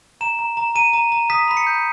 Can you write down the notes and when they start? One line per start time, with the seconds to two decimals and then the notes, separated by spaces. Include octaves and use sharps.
0.21 A#5 E7
0.39 A#5
0.57 A#5
0.75 A#5 D#7
0.93 A#5
1.12 A#5
1.30 D#6 B6
1.48 B5 B6
1.57 C#7
1.67 G6